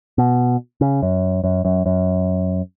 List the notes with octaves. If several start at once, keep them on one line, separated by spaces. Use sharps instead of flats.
B2
C#3
F#2
F#2
F#2
F#2